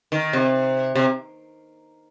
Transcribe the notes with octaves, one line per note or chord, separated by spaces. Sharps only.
D#3
C3
C3